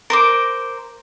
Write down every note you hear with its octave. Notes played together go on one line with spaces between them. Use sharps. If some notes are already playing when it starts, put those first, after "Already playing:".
A#4 C5 D6